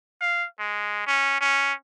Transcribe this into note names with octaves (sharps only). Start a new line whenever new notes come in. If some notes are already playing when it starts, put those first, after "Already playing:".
F5
G#3
C#4
C#4